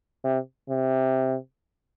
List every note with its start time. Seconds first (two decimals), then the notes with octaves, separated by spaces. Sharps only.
0.24 C3
0.69 C3